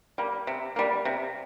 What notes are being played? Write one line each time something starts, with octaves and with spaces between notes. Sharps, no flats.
G3 A#3
C3
G3 A#3
C3